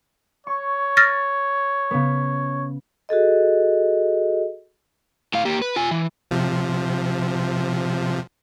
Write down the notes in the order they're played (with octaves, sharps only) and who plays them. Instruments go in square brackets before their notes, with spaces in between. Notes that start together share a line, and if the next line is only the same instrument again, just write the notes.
[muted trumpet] C#5 [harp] C#6
[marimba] F6 A6 A#6
[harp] C#3 B3
[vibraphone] F#4 G#4 A4 D#5
[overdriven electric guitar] A2 F5
A#3 G4
B4
F4 G#5
E3
[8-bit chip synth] C3 F3